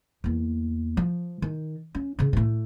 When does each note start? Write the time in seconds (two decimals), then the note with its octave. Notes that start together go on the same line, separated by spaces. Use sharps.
0.24 E2 A#3
0.97 F3
1.42 D#3
1.95 C#4
2.19 C#3 C4
2.33 A2 A3